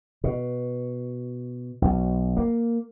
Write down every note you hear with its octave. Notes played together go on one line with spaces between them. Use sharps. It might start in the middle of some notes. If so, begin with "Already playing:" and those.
B2
B1
A#3